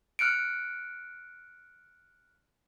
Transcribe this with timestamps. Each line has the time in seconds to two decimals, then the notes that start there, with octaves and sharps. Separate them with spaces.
0.19 F6 F#6 C#7 D7